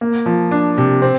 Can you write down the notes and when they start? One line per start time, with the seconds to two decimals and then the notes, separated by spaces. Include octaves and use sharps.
0.01 A#3
0.26 F3
0.51 D4
0.78 C3
1.02 C4